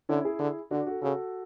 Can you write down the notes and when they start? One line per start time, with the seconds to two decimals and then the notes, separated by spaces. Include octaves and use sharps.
0.09 D3 C#4 E4
0.25 E4 G#4
0.39 D3
0.71 D3 D4 F#4
0.87 F#4 A4
1.02 C#3 F#4 A4